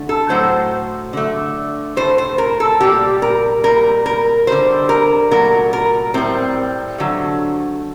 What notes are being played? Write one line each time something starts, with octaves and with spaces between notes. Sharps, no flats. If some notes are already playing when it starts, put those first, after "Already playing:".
Already playing: D3 A3
A4
A2 F#3 A3 C5
D3 A3
A2 A3 C5
C5
A#4
A4
A#2 G3 G4
A#4
A#2 G3 A#4
A#4
D3 G3 C5
A#4
A#2 F#3 A3 A#4
A#4
A2 G3 C4
D3 F#3 A3